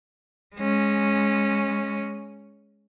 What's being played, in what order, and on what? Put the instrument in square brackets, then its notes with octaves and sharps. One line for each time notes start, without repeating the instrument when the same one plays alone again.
[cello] G#3 C#4